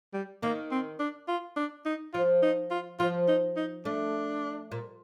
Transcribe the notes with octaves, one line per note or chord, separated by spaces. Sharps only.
G3
D#3 A#3
C4
D4
F4
D4
D#4
F3 F4
D#4
F4
F3 F4
D#4
D#4
A3 D4
A#2